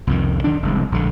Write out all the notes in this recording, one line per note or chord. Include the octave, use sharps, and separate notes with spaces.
C2 F2 D#3
D#3 D4
F1 C2 G#3
A#1 D3